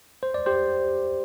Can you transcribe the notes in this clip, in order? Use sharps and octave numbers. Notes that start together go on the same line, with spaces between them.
C5
D5
G4 C5